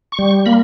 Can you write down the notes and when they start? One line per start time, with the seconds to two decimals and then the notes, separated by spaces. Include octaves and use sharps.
0.12 C#6
0.19 G3
0.46 A#3 B5